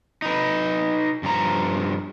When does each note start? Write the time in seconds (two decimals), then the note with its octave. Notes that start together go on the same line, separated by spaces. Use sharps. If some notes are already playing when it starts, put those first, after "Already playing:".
0.22 D#4 B4
1.23 G2 F3 A#5